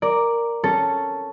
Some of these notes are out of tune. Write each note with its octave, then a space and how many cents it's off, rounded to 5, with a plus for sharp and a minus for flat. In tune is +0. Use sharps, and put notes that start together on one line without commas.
A#4 +0 D5 +0
C#4 +0 A4 +0